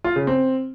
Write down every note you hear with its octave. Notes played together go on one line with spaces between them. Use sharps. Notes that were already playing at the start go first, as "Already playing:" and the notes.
F4
C#3
C4